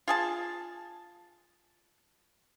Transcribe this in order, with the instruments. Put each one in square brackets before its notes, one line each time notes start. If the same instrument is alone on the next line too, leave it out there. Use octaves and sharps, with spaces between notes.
[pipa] F4 G#4 A5